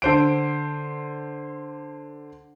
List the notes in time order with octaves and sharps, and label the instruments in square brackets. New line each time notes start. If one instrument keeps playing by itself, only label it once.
[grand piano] D3 C5 D7